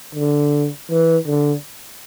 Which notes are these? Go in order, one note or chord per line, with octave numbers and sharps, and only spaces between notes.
D3
E3
D3